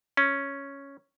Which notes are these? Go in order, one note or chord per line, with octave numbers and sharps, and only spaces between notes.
C#4